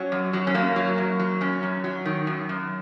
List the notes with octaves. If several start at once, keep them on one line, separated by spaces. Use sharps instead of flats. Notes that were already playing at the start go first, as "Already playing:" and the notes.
Already playing: F#3 C#4
F#2
F#3
C#4
F#2 A#3
F#3
F#2
F#3
F#2 C#4
F#2
F#3
D#3
F#2
F#2